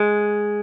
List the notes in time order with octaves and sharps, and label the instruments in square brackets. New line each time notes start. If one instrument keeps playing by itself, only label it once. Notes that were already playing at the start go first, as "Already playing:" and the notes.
Already playing: [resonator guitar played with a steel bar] G#3